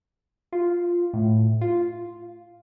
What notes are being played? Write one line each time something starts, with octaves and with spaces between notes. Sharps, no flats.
F4
A2
F4